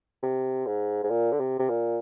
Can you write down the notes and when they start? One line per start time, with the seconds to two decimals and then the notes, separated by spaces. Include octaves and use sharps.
0.23 C3
0.66 G#2
1.04 G#2
1.10 A#2
1.32 D3
1.40 C3
1.59 C3
1.69 A#2